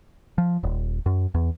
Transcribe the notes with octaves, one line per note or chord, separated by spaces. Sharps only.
F3
D#1
F#2
E2